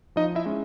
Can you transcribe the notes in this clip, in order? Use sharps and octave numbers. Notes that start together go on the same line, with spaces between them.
F3 D#4 D#5
E4 E5
G#3 C#4